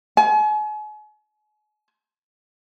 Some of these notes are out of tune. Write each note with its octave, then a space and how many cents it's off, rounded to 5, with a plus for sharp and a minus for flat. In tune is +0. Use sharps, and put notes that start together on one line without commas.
G#5 +40